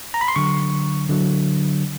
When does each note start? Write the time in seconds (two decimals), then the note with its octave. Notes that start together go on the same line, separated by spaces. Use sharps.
0.14 A#5
0.21 B5
0.28 C6
0.36 D3 F#3 C#6
1.09 D3 F#3